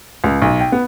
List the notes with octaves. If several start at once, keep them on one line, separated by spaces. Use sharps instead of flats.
C#2
B1
G5
B3